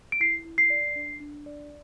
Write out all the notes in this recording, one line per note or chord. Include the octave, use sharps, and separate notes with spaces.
D7
E4 C7
E4
C7
D5
D4
D4
D5